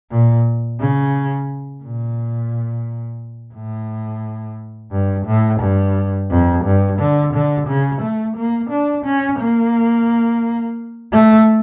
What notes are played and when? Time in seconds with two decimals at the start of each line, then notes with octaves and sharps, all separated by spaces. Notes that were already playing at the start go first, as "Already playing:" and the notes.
0.10 A#2
0.80 C#3
1.83 A#2
3.54 A2
4.91 G2
5.26 A2
5.61 G2
6.30 F2
6.65 G2
6.99 D3
7.33 D3
7.67 C#3
8.02 A3
8.37 A#3
8.70 D4
9.05 C#4
9.40 A#3
11.12 A3